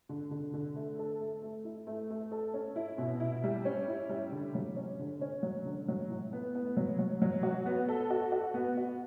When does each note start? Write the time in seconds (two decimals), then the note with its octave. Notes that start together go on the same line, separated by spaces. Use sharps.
0.09 D3
0.31 D3
0.54 D3
0.76 A3
0.99 A4
1.20 A3
1.42 A3
1.65 E4
1.87 A3
2.10 A3
2.32 A4
2.54 C#4
2.76 E4
2.98 B2
3.20 E4
3.44 G3
3.65 C#4
3.88 E4
4.09 G3
4.32 D3
4.55 F#3
4.76 C#4
4.99 D3
5.21 C#4
5.43 F#3
5.65 D3
5.88 F#3
6.10 A2
6.33 B3
6.55 B3
6.77 F#3
6.99 F#3
7.22 F#3
7.43 F#4
7.66 B3
7.89 A4
8.10 F#4
8.32 F#4
8.54 B3
8.77 F#4